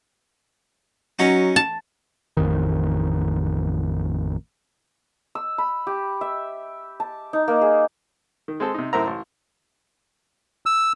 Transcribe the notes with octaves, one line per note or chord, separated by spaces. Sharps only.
F#3 C#4 D#4 F#4
A5
A1 F2 D#3
E6
B5
G4
E5
A5
D#4
A#3
G#4
D#3
G#3 C4 A4
C3 D#4
F#2 A2 A#4 C5 E5 A#5
A1
E6